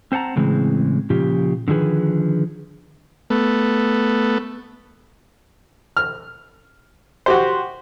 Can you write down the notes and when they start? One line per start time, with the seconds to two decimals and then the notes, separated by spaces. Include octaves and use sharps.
0.12 C4 C5 F#5 A5 A#5
0.36 A2 C#3 E3 G#3 C4
1.10 A#2 C#3 F3 G4
1.68 D3 D#3 F3 G#4 B4
3.30 A3 B3
5.97 F6
7.26 F#4 G4 C5